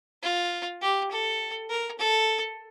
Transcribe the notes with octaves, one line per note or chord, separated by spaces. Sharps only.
F4
G4
A4
A#4
A4